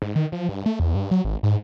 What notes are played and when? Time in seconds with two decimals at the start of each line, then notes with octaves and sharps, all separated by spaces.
0.02 G#2
0.16 D#3
0.32 F3
0.49 G2
0.66 A3
0.80 E2
0.95 G2
1.11 F#3
1.25 G#1
1.43 G#2